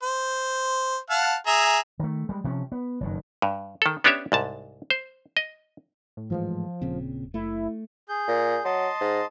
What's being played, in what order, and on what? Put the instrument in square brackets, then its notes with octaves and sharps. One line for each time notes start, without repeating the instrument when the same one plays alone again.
[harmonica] C5
F5 F#5 A5
G#4 E5 A#5
[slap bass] D#3 A3
G3 G#3
C3 F3 C#4
B3
F#1 G2 D#3
[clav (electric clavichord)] G2
D#3 A4
B3 C#4 D4 G4 C#5 E5
C2 G#2 A5
C5
D#5
[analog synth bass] A2
[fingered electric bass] G#2 E3 G#3 [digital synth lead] F3
[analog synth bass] D#1 [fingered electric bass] A#2 C#3 C4
[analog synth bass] F#1 [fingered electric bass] A3 [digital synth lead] E4
[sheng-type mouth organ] G#4 G6
[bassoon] A#2
[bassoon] F#3 [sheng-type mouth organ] D#5 A5 C6
[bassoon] G#2